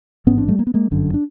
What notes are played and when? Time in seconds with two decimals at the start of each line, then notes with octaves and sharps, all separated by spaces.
0.27 A1 G#2 B3 C#4
0.38 C4 D4
0.48 G3 A3
0.59 A#3
0.67 B3
0.74 G#3 A#3
0.91 G1 F#2 D3
1.14 D4